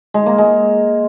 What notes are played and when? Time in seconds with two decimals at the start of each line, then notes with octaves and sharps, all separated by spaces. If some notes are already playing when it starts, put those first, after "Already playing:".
0.14 G#3
0.26 A#3
0.38 G#3